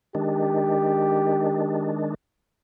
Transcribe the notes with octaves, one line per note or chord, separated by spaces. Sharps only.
D#3 G#3 D4 G4